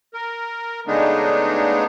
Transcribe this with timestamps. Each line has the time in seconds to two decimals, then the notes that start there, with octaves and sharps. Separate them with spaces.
0.14 A#4
0.87 C#3 G#3 A3 B3 D4 D#4